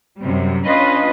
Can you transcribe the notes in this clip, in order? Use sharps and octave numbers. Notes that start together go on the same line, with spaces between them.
F#2 C3 G3
C#4 D4 F4 B4 D#5